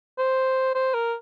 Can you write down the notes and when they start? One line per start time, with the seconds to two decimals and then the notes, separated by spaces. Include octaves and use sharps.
0.19 C5
0.75 C5
0.94 A#4